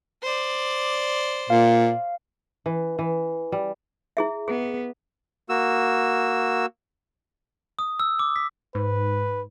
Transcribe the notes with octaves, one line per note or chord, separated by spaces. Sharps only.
C5 D5
A#2 F5
E3
E3
G3
E4 G#4 E5
B3 G#4
A#3 F#4 E6
D#6
E6
D6
B6
G#2 B4